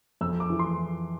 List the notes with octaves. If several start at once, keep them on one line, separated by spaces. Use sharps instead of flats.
F2 E6
D6
E3
C6